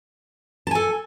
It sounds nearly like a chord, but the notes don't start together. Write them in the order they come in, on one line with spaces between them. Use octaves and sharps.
A5 G#5 A4